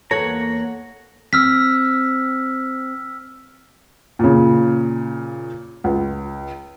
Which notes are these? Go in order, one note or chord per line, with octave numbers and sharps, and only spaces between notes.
E2 A#3 A4 C#5 F#5 A#5
C4 E6 F6 B6
A#2 C#3
C#2